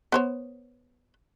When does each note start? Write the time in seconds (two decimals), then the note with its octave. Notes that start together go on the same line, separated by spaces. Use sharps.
0.12 B3 C5 C#5